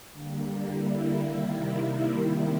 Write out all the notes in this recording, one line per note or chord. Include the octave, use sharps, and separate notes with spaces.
D3 G3 A#3
E4
C3 D#3 G3 A#3